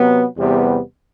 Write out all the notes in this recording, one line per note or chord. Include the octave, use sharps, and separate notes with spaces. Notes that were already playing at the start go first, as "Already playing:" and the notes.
Already playing: C3 F#3 B3
E2 C3 G3 B3